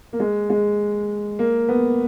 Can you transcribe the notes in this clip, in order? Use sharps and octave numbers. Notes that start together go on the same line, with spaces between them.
A#3
G#3
G#3
A#3
B3